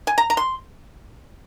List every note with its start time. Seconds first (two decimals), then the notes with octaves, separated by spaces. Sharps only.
0.07 G#5
0.18 A#5
0.30 A#5
0.37 C6